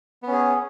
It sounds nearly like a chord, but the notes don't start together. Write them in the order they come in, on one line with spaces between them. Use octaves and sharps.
B3 C#4 G#4